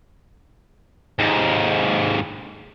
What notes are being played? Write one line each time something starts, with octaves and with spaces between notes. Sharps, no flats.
D#2 G#2